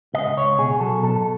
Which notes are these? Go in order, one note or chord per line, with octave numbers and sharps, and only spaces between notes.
C#2 D#5
C#2 C#5
B2 G#4
F#3 A4
B2 A4